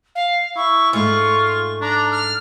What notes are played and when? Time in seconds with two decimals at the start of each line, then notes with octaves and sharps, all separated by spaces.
0.15 F5
0.56 E4 C#6
0.93 G#2 A3 F4 G#4 C#6
1.81 D4 A#5
2.11 F6